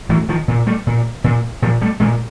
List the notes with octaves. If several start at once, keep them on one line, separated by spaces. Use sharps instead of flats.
A2 E3 F#3
D#3 F3
A#2
G3 A3
A#2
A#2
A#2 F3 G3
G3 A3
A#2 G#3 A#3